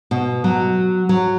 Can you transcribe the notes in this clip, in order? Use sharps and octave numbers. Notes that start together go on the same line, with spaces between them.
B2
F#3
F#3